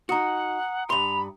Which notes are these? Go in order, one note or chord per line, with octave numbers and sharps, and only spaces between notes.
D#4 F#4 F#5 A#5 D#6 C#7
G2 B5 C6 F7